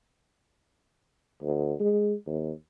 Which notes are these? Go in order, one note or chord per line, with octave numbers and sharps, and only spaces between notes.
D2
G#3
D#2